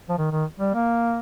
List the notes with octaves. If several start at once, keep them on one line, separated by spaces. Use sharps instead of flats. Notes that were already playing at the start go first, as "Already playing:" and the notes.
F3
D#3
D#3
G3
A#3